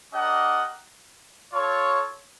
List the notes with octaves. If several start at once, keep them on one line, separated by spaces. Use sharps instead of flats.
D4 G4 A#4 D#5 F#5
F4 A4 C#5